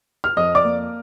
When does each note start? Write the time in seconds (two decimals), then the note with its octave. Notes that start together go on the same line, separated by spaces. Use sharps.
0.24 F6
0.37 F2 D#5 D#6
0.55 D5 D6
0.64 A#3